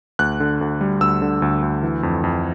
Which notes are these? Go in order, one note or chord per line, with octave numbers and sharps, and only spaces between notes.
D2 F#6
D3
D2
G3
D2 E6
D3
D2
D2
E3
F2
F2